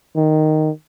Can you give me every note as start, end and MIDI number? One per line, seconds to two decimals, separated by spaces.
0.16 0.71 51